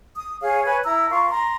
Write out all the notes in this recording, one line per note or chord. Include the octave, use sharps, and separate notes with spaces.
D#6
G#4 C#5 F5
B4 C#5 G#5
E4 A#5 E6
F4 A#4 C#6
A#5 C6